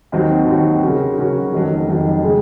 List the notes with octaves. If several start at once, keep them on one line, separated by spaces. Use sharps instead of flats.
D#2 D#3 F#3 C4 F#4
D#2 D#3 F#3 C4 F#4
C#3 F#3 C#4 F#4 A#4
C#3 F#3 C#4 F#4 A#4
F1 F2 D#3 F#3
F1 F2 D#3 F#3
C#3 G#3